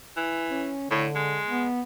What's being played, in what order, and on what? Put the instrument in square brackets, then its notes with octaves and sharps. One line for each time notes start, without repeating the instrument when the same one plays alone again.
[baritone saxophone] E3
[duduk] C#4
[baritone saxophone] A2 [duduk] D3
[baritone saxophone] G#3
[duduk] B3